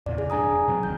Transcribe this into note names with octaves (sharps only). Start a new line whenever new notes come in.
E2 A#2 C#3 D5
G#4
F2 G#2 D4 G#5 A#5 D#6
F1
B2 F#3 C4
D#1 C#2 D#3 G6